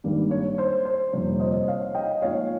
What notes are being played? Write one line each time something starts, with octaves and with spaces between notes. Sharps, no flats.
G#1 G2 D#3 G3 A#3
C#5
C5
C5
G1 F2 C3 G3 A#3 C#5
C5 D#5
C#5 F5
D#5 G5
G#2 F3 A#3 C#4 F4 C#5 F5